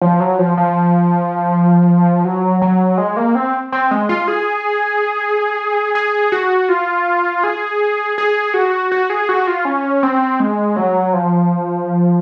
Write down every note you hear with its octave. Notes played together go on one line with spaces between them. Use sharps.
F3
F#3
F3
F3
F#3
F#3
G#3
A#3
C4
C4
G#3
F4
G#4
G#4
F#4
F4
G#4
G#4
F#4
F#4
G#4
F#4
F4
C#4
C4
G#3
F#3
F3